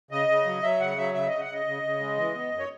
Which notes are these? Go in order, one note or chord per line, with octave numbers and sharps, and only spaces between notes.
C#3 D#5
C#3
F#3
F#3 E5
C#3 F#5
F#3 E5
C#3 E5
C#3 D#5
F#5
C#3 D#5
C#3
C#3
G#3
E3
B3
F#2
C#5